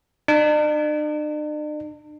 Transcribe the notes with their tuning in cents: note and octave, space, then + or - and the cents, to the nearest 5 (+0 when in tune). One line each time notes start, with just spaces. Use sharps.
D4 +45